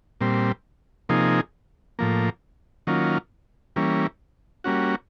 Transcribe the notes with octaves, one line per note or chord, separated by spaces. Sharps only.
A#2 G3 C4
C3 F3 A#3 D#4 G#4
A2 F3 A#3
D#3 F#3 A#3 C#4 F4
E3 G3 A#3 C#4
G3 A#3 C#4 F#4